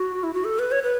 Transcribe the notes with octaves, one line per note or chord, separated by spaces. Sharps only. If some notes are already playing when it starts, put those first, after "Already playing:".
Already playing: F#4
E4
F#4
A4
B4
C#5
B4